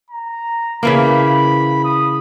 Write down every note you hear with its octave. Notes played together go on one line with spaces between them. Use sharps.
A#5
C#3 E3 A#3 B5
D#6